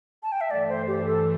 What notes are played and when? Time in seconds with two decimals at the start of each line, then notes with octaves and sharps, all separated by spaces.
0.23 A5
0.32 G5
0.41 E5
0.50 G2 E3 A3 D5
0.69 C5
0.87 G4
1.07 A4